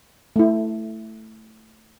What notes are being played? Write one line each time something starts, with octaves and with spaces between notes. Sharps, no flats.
A3 E4